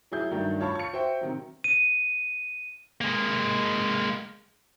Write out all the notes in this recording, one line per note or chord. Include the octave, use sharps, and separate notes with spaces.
F#3 E4 G#4 G6
G2 D#3 F#3 A3 D4
F4 C#5 F5 A5 B5 C#6
C#6 C#7
F#4 C5 E5 G5
C3 D#3 F#3
D#7
G#3 A#3